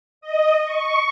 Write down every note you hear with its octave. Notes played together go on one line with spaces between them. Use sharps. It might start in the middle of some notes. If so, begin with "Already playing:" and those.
D#5
C#6